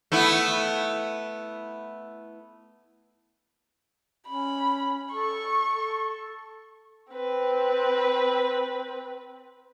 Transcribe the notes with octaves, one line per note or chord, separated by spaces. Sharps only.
A3 B3 E4
C#4 B5
A4 C#6
A4
C4 B4